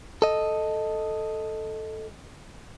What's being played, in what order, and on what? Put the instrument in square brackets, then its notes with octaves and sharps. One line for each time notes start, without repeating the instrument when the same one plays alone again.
[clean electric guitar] A4 D#5